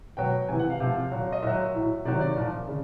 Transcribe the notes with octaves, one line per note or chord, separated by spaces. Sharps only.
B2 F#3 G5
C3 E3 G#5
F#5
F5
C3 F3 F5
A#2 F#3
D#5
A#2 F#3 E5
A2 F#3
C3 D#3 F#3 D5
D5
A#2 F3
C#3